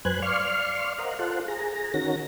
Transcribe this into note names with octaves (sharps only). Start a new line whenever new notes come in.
F#2 B4 C5 G#5 F#6
D5 F5 C6 C#6 F6
A#4 C5 D#5 F5 F#5
F4 A4 C5 F#5
G#4 A#5
D#3 C#4 F#4 A#4 A#6